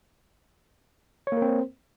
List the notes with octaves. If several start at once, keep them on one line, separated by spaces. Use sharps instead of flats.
A#3 C4 A#4 C5 C#5